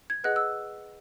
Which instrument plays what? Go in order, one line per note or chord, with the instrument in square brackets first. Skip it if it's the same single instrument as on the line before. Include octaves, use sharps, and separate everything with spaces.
[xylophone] G#6
G#4 B4 D#5 F#5 F#6
E6